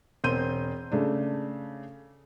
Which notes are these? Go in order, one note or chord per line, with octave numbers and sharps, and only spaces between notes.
E1 C4 C6 G6 D#7
C#3 A3 D4